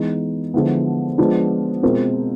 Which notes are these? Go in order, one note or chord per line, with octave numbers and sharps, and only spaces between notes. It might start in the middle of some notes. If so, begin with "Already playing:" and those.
Already playing: E3 G#3 B3 D#4
D3 F3 G#3 B3 E4
F3 G#3 B3 D4 F4
B2 G#3 C4 F4 A#4